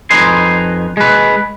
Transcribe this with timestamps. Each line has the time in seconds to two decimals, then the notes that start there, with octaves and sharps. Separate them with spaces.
0.11 F2 D#4 B4 G#5 C6
0.97 G#3 B4